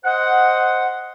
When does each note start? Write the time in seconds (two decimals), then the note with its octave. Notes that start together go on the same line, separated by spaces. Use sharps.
0.04 C5 D#5 F#5